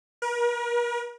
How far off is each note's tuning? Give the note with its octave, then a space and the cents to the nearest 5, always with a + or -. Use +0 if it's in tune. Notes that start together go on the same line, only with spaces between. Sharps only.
A#4 +45